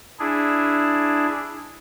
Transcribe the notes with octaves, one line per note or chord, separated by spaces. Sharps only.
D4 E4 G#4